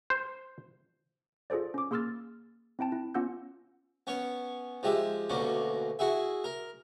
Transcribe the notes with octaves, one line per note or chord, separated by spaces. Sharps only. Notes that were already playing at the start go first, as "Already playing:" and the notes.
C5
F4 G#4 A4 C5 D5
C#4 D6
A#3 G#4 C6 E6 F6 A6
C4 E4 G5 A5
E4
B3 C#4 F4 F#5 E6 G6
B3 C#4 C#5
F3 G#3 G4 E5
D2 B2 D3 A#3 C#4
E4 F#4 G#4 E5
A#4